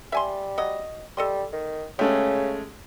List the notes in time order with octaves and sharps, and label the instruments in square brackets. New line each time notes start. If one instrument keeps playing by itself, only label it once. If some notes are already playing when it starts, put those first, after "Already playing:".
[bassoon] G3 [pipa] E5 G#5 C6
[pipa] F#3 D#5
[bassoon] G3 [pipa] A4 D#5 C6
[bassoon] D#3
[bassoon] C#3 [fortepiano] G#3 A3 C#4 [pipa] G4